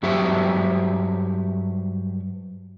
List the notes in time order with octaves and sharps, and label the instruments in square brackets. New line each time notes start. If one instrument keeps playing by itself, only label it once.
[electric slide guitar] G2 F#3 F#4 G4 C5 E5